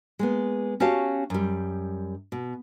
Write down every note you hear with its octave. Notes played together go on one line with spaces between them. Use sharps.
G#3 A#3 B3
C#4 F#4 G4 C#5 F5 A5
F#2 G3
B2